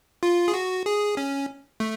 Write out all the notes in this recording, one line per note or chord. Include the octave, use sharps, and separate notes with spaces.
F4
G#4
F#4
G#4
C#4
A3